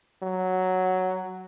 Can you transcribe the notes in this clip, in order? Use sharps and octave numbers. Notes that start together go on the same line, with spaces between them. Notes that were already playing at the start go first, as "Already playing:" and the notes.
F#3